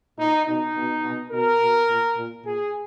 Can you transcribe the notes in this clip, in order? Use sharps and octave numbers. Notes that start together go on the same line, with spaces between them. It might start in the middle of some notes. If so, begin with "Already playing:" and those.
A#2 D#4
B2 D#4
B2
B2
B2 A#4
B2
A#2
A#2
A#2 G#4